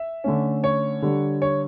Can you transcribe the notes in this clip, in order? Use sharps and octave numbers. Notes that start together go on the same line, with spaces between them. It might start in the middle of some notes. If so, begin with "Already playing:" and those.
Already playing: E5
D3 A3 C#4
C#5
D3 G3 D4
C#5